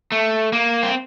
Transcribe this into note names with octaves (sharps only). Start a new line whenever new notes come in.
A3
A#3
C4